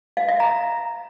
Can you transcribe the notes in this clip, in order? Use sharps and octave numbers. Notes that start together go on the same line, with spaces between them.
F5
E5
A#5